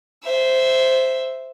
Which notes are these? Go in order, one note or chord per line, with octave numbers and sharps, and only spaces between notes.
C5 E5